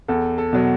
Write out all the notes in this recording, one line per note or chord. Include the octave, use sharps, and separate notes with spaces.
E2 A4
A4
B2 F#3